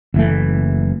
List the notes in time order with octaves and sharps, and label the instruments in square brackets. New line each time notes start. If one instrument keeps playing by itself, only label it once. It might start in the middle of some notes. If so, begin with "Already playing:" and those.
[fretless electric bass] F#1 E3 A3